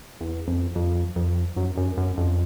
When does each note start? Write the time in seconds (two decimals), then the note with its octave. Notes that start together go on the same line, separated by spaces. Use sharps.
0.21 E2
0.48 F2
0.75 F2
1.16 F2
1.56 F#2
1.78 F#2
1.97 F#2
2.18 F2